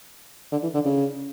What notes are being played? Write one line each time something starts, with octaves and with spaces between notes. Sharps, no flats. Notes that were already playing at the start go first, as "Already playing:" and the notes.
D3
E3
D3
C#3